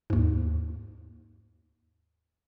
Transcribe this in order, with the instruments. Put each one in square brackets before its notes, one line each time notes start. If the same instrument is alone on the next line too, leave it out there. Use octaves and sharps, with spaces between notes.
[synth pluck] D#2 G#2